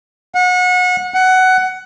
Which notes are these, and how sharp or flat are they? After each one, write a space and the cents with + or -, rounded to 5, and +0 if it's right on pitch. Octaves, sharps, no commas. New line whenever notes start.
F#5 -30
F#5 +15